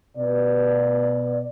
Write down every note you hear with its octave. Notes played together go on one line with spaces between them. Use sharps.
B2 D5